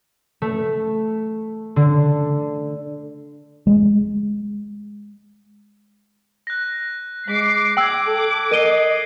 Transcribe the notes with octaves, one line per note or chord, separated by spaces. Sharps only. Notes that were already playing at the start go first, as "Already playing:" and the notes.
A3
D3
G#3
F#6 A#6
G#3 D6 B6 C7
G5 D6 E6 G#6 F#7
A4
A#4 D#5 C7 D7 D#7 G7